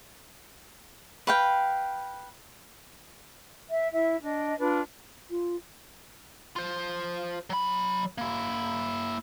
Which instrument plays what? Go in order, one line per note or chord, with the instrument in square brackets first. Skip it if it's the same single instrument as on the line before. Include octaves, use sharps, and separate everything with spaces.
[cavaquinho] B4 F5 G5
[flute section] E5
E4 E5
D4 D#5
D4 F4 B4
[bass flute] F4
[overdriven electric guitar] F4 C5
F#3 B5
A#3 E4